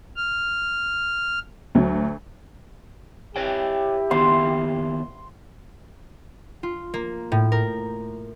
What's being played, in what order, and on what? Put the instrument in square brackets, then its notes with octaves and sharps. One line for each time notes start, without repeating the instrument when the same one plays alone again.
[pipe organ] F6
[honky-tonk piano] D2 F#3
[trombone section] E4 G4 [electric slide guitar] B4 C#5 G5
[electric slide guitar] D#3 A#3 B3 [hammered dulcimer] C6
[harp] F4
A#3
A2
A#4